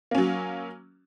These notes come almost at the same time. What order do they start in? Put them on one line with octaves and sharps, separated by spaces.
A#3 C#4 F#3